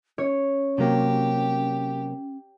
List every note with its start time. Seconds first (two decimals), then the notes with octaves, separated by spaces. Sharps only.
0.18 C#4 C#5
0.78 C3 F#3 A#3 G4